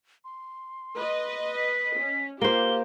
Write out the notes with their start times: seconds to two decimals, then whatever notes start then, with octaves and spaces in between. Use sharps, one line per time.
0.25 C6
0.96 B4 D#5
1.56 B6
1.99 C#4
2.41 A#3 F4 G4 C5 G7